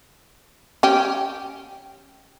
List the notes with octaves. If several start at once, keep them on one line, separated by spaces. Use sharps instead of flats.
C#4 G4